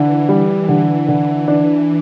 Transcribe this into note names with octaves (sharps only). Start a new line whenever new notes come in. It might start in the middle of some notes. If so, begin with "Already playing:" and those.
Already playing: D3 E3
G3
D3
D3
D4